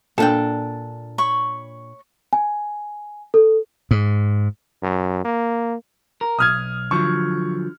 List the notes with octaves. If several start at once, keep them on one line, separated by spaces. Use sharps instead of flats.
A#2 D4 A4 G5
C#5 B5 C#6
G#5
A4
G#2
F#2
A#3
A#4
B1 D#6 F6 G#6
D3 F3 F#3 C#6